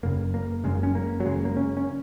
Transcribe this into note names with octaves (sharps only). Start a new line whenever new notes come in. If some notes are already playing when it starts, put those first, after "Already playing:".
F#1 F#2 C#3 A#3
A#3
F#1 F#2 C#3 G#3
C#4
A#3
F#3
F#1 F#2 C#3 G#3
A#3
C#4
C#4